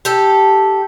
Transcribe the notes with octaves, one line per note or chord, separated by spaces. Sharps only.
G4 A4